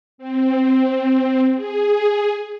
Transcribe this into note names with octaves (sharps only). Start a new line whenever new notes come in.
C4
G#4